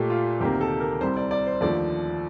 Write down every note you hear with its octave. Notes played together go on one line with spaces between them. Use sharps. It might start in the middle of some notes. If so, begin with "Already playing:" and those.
Already playing: A#2 A3 G4
F4
D2 C3 D#3 A#3 G4
A4
A#4
C2 C3 G3 C5
D5
D5
C5
D#2 D3 F3 A3 D5